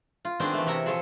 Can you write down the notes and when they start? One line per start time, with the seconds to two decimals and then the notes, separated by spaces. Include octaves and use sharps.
0.25 F4
0.40 D#3 B3 C4 D4 G#4 C5
0.53 E3 A3
0.67 C3 E4 A#4 C#5 E5 A#5
0.86 A#2 F3 G#4 A4 C#5